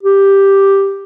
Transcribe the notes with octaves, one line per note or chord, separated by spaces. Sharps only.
G4